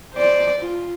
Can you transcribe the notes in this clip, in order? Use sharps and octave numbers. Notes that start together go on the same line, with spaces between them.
C5 D5
F4